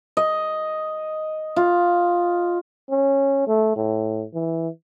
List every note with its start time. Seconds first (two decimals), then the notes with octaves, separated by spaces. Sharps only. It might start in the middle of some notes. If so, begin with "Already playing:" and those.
0.17 D#5
1.56 F4
2.90 C#4
3.47 A3
3.76 A2
4.34 E3